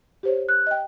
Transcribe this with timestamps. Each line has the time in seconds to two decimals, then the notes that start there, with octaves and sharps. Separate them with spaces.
0.23 G4 C5 C#5
0.49 F#6
0.67 D#5 G5